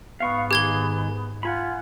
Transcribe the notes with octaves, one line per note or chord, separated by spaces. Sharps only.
G#2 B3 F5 C#6
D#3 G4 G#4 G#6 G7
F4 F#5 G#5 B5